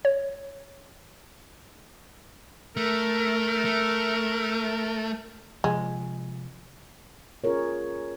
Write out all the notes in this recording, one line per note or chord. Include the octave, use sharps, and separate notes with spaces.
C#5
A3 A#4
A3
C3 F3 G#3
C#4 F4 G#4 A#4 C#5